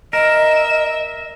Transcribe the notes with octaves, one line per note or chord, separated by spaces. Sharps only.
A#4 D#5 E5 E7